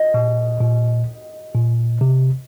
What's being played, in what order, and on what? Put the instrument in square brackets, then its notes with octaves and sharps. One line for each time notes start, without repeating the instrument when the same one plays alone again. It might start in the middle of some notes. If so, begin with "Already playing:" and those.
Already playing: [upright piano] D#5
[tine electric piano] A#2
A#2
A#2
C3